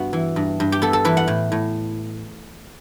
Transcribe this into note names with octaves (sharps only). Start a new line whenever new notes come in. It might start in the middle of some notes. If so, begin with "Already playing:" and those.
Already playing: G2 B3 F#4
E3
G2
G2
G4
B3 A4
A4
E3 B4
F#5
A2
A2